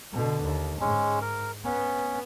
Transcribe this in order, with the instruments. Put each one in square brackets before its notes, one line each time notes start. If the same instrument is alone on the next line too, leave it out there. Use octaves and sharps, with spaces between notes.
[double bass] B2 D3
D#2
[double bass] G#2 [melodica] G#3 C#4
[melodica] A#4
[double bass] B3 [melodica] C#4